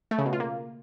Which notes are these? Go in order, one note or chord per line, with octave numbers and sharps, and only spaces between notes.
A3
C#3
B2
F4
A#3